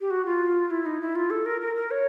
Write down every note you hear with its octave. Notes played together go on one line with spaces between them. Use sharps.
G4
F#4
F4
E4
D#4
E4
F4
A4
A#4
A#4
A#4
C#5